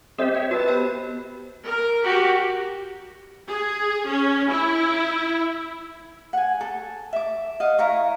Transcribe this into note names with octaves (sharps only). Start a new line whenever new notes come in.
C4 G4 A4 C5 D#5 E5
C#5 E5 G5
F#4 A#4 B4 D#5 A5
B3 G4 C5
A#4
F#4 G4
G#4
C#4
E4
F#5 G#5
A4
E5 D6
D#5 F5 F#5
E4 F5 A#5 C#6